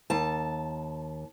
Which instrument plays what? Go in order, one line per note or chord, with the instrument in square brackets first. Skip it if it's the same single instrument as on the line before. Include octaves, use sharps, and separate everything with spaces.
[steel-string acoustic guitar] D#2 A5